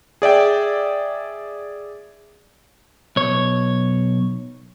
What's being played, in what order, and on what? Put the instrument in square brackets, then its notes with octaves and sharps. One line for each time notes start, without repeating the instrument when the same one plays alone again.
[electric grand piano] G#4 D5 E5 G5
[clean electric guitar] B1 C#5